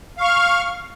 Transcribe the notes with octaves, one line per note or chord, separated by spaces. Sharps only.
F5 C#6 F6